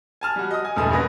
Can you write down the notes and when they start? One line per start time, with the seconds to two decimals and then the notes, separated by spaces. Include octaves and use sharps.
0.21 G#5 A5 F6
0.36 G3 F#4
0.51 D#5 D#6
0.65 G#5
0.76 E1 E2 G2 A3 A5 D#6
0.91 A1 A#3 B4 A#6